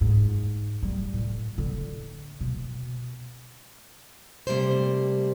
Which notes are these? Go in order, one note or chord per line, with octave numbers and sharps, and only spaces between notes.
G#2
G3
A2
D3
B2
C3 G3 A3 A#3 C5